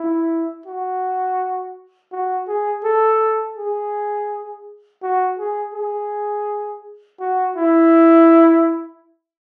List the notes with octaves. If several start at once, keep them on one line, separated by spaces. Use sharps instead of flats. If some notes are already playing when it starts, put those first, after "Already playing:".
Already playing: E4
F#4
F#4
G#4
A4
G#4
F#4
G#4
G#4
F#4
E4